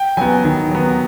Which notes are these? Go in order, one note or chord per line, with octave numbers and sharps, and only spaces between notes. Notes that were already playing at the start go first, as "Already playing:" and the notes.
Already playing: G5
F#3 B3 G#5
D#3
F#3 B3